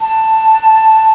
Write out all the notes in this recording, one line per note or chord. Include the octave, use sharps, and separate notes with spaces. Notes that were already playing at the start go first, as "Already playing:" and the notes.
A5